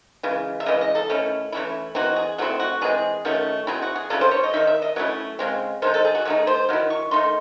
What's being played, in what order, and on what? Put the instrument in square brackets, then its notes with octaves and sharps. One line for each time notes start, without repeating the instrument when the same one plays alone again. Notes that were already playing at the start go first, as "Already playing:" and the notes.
[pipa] C#3 E3 G#3
E5
C#3 E3 G#3 D#5
D#5
A4
D#3 A3 C#4 E4
E3 A3 C#4 E4
E3 C4 D#4 F#4
G#4
F#3 A3 C4 E4 F#4
F#4
E3 G#3 C4 G#4
D#3 F#3 A3 C#4
F#3 C4 E4 G#4
F#4
G#4
C#3 F#3 C#4 E4 A4
C5
C#5
D#5
D#3 G#3 D#4 E5
E5
D#5
F#3 A3 C#4 E4 C#5
C#3 G#3 C4
D#3 G#3 D#4 C5
A4
G#4
F#4
D#3 A3 D#4 G#4
C5
D#3 F#3 E4
C#6
D#3 A3 D#4 C6